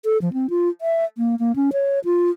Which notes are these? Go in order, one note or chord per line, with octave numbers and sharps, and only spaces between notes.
A4
F3
C4
F4
E5
A#3
A#3
C#4
C#5
F4